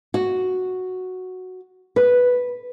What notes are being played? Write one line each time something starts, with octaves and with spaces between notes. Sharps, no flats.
F#4
B4